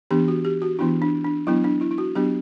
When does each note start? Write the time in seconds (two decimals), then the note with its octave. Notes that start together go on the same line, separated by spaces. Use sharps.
0.11 E3 B3 D4 G4
0.28 F#4
0.45 G4
0.62 F#4
0.79 E3 B3 D4 E4
1.02 D4
1.24 D4
1.47 F#3 B3 D4 E4
1.64 D4
1.81 E4
1.91 E4
1.98 F#4
2.15 F#3 B3 D4 G4